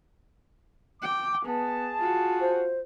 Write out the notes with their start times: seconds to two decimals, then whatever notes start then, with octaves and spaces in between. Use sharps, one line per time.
1.02 G5 D6
1.45 B3 G#4 A5
1.98 F4 F#4
2.41 C5